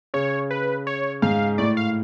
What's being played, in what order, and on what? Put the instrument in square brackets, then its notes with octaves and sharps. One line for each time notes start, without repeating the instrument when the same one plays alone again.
[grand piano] C#3 [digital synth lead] C#5
[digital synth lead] B4
C#5
[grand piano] G#2 [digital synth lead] F5
[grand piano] A2 [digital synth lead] D5
[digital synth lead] F5